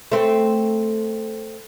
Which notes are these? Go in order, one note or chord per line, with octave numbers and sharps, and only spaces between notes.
A3 C4